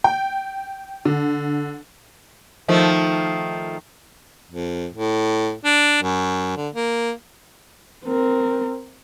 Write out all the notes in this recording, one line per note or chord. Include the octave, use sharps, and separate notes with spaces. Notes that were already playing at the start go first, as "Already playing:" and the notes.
G5
D3
D#3 F3 A3
F2
A2
D4
F#2
D3
A#3
C4 A#4